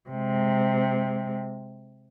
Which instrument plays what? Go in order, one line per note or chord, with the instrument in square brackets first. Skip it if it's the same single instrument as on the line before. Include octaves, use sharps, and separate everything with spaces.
[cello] C3 G#3